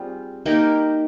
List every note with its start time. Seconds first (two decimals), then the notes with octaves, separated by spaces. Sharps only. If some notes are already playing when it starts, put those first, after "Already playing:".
Already playing: G3 C4 F4 G#4
0.46 A#3 D#4 G4 A#4